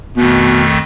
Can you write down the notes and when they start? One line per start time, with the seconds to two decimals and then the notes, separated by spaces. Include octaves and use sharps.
0.17 F2 B2 D#3 A3